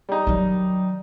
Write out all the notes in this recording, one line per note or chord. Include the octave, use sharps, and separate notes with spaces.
G3 D#4
D#3 F#3